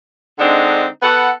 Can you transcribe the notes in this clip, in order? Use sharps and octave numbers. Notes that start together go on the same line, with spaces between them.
D3 G#3 C4 D4 D#4
B3 A4 B4 F#5